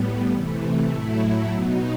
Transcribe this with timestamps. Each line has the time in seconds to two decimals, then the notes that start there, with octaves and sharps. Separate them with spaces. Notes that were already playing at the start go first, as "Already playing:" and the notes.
Already playing: A2 G3 B3
0.30 C3 E3 A3
0.90 A2 F#3 A3 E4
1.50 B2 F#3 B3 D#4